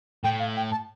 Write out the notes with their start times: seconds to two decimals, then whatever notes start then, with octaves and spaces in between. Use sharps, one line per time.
0.24 A2 G5
0.39 F5
0.57 G5
0.72 A5